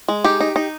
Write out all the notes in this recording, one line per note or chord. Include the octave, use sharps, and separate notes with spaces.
G#3
D#4 G4
D#4
D#4